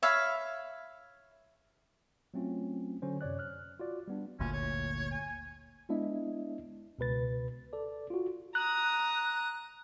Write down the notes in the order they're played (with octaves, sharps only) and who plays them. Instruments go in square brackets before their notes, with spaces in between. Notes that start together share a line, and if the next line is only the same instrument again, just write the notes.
[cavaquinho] C#5 E5 F5 B5
[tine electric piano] F#3 A3 C4 C#4 F4
D3 F#3 C#4 C5
F#2 C3 C#5 D5 F#6
F6 F#6
F4 F#4 D5
G3 B3 D4
[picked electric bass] G1 D2 A#2 [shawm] C#4
[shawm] C#5
G#5
[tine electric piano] G#3 B3 D4 E4 D#5 E5
C#2 B2 B4 A6
A4 D5
F4 F#4
[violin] A#5 D#6 [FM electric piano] F#6